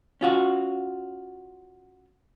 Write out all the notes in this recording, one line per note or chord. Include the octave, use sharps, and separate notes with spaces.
C#4 F4 F#4